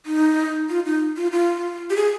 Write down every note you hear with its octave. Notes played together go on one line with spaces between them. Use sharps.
D#4
F4
D#4
F4
F4
G4
G#4